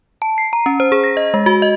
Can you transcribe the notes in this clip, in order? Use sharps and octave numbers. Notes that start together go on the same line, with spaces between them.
A5
C7
A#5
C#4
C5
G#4
A#6
D#5
G#3
F#4
D#5